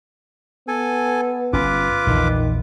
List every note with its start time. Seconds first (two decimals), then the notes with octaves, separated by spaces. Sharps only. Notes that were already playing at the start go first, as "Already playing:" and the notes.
0.68 B3 A4 G#5
1.53 G1 C#4 F4 B4 D6
2.07 A#1 E2 D#3